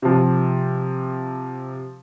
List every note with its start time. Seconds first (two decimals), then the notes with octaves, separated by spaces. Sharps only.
0.02 C3 F3